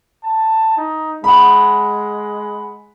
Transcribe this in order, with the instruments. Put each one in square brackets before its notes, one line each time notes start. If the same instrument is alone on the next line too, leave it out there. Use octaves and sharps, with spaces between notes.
[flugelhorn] A5
D#4
[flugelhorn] G#3 [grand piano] F#5 B5